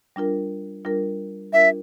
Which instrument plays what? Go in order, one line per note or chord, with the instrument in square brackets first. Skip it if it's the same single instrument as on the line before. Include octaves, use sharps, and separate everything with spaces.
[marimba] G3 D4 F4 A#4
G3 D4 F4 A#4
[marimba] G3 D4 F4 A#4 [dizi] E5